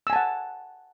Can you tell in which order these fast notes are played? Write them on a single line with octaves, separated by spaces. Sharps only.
E6 G#5 A5 F#5